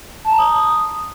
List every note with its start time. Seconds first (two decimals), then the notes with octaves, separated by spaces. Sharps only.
0.25 A5
0.32 A#5
0.38 D#6